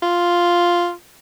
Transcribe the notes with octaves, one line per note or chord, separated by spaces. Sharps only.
F4